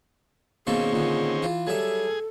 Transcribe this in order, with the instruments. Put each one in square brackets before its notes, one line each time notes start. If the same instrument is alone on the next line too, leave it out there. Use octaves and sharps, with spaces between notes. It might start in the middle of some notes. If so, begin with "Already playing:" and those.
[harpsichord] B2 A#3 A4 [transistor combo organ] D#3 C4 C#4 [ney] G#4
[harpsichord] A#2 D3
E3 F4
[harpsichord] F#3 G3 E5 [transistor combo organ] G#4 [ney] A4